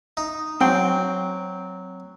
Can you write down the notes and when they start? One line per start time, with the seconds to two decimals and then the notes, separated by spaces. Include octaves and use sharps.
0.17 D#4
0.61 F#3 C4 G5